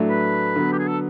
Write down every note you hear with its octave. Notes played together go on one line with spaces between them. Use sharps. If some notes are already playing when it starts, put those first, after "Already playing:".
Already playing: A2 F#3 A3 D4
B4
D3 F#3 B3
G4
G#4
A4